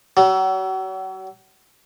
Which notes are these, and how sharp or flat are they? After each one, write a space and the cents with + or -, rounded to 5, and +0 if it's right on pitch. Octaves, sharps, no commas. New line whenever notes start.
F#3 +40